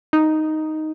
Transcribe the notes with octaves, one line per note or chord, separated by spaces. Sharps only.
D#4